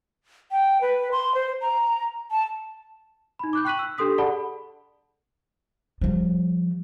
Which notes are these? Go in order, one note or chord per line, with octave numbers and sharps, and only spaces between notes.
G5
B4
C6
C5
A#5
A5
D#4 B5
D6 F#6 G6
G5 C#6 F#6 B6 D#7 F#7
E6
D4 G4 A4 C6 D#6 B6
G#4 A4 D5 F#5 A5 B5
F3 G3